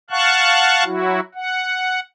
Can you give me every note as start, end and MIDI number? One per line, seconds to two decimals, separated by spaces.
0.10 0.84 77
0.10 0.84 78
0.10 0.84 81
0.10 0.84 85
0.10 0.84 90
0.84 1.20 54
0.84 1.20 64
0.84 1.20 66
1.35 2.00 78